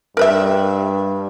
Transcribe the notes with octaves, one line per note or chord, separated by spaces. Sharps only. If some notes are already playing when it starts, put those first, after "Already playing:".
G2 A#4 B4 E5